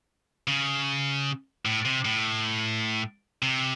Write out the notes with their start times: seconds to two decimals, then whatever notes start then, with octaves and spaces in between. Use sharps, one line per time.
0.47 C#3
1.65 A2
1.85 C3
2.05 A2
3.42 C3